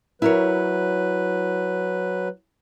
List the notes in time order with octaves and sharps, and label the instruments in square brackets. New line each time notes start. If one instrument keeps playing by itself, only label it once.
[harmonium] F#3 B4 [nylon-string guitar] E4 A#4 C#5